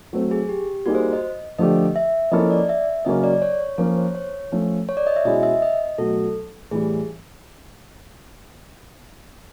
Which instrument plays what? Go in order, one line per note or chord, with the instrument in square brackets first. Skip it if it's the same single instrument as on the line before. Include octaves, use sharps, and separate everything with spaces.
[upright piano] F#3 A3 C4
[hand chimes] G#4
G4
[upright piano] G3 A#3 D#4 G#4 [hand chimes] F#4
[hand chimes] C5
D#5
[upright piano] D3 F3 A3 D4 G4 [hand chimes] D#5
[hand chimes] E5
[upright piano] F3 A#3 C#4 E4 A4 [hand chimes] D#5
[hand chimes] D5
E5
[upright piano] C#3 F#3 A#3 C#4 [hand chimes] D#5
[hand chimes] D5
C#5
C#5
[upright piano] F3 A#3 C#4 [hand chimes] C#5
[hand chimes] C5
C#5
[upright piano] F3 A3 C#4
[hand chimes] C#5
D5
D#5
E5
[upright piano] B2 G#3 C#4 E4 [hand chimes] D#5
[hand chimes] E5
D#5
[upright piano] B2 F#3 A3 [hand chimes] A4
[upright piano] A2 E3 G3 [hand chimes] G#4